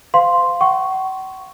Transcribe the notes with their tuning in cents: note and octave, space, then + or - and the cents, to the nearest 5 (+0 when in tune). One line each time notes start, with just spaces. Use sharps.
C5 -35 F5 +0 C6 +0
F#5 +45 C#6 +0